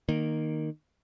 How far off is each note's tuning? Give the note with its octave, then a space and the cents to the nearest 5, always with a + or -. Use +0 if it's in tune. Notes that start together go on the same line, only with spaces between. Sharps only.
D#3 -10 A#3 +0